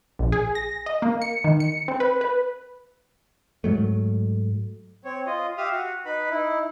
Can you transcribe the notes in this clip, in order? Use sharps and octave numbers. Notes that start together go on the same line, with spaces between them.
A#1
G#4
A#6
D#5
A#3
C#7
D#3
C#7
C4
B4
B4
G#2 F#3 A3
C4 C#5
F4 D#5
G4 E5 F5 D#6 F6
F#4
D#4 B4 B5
D#4 E4